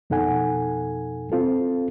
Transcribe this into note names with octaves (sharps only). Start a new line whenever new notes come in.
F2 B2 D#4 A4 F#5 G#5
C4 F4 A4